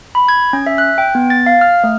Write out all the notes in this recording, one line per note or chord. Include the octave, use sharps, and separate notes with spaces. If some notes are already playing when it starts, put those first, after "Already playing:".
B5
G#6
C#4
E5
F#6
G5
B3
A6
F5
F6
A3